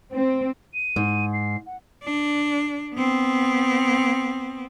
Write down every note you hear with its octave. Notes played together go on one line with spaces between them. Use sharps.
C4
D#7
G#2
C7
F#5
D4
B3 C4